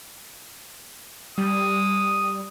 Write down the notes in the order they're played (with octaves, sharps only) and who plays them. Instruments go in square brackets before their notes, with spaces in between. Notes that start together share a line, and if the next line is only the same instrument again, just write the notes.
[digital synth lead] G3 [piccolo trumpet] D#6